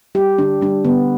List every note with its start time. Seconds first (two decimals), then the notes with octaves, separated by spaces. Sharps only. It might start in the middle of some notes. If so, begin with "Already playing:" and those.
0.15 G3 G4
0.38 D3 D4
0.61 G3 D4
0.85 D3 B3